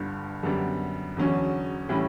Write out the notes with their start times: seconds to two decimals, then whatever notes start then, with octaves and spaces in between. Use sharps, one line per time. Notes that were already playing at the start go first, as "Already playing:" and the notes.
Already playing: G1 G2 D3
0.43 F#2 D3 G3 B3 D4
1.16 E1 E2 D3 F#3 C#4
1.89 A2 E3 G3 C#4